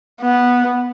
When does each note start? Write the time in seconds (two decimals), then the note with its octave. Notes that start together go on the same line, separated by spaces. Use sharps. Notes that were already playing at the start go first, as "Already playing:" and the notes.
0.21 B3